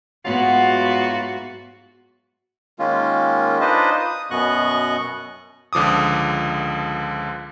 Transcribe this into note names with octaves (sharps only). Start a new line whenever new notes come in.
G#2 F#3 B3 F4 F#4 E5
D#3 G#3 A#3 C#4 F4
D4 D#4 F4 B4 C5 D#5
D#6
F#2 B2 B3 D#5 C#6 F#6
C#2 D3 F3 D6 D#6